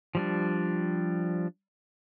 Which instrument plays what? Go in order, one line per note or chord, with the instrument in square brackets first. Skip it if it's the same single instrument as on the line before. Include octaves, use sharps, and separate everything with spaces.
[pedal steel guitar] F3 G3 D4